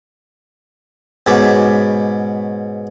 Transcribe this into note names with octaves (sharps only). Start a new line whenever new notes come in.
G#2 B2 C#4 B5 D6